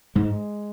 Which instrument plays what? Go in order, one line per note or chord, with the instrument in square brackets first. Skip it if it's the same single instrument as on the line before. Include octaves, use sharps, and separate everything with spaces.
[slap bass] G#2 G#3